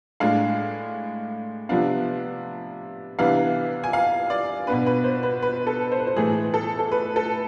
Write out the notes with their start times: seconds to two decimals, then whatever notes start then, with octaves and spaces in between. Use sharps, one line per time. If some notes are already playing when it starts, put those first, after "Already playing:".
0.20 A2 G#3 D4 F5
1.69 C3 F3 B3 D4 F5
3.18 C3 E3 B3 D4 F5
3.84 G#5
3.93 F5
4.30 D5
4.67 B2 B3 D4 B4
4.86 B4
5.04 C5
5.23 B4
5.42 B4
5.67 A4
5.92 C5
6.00 B4
6.07 C5
6.16 A2 E3 A3 G#4
6.54 A4
6.79 A4
6.92 B4
7.16 A4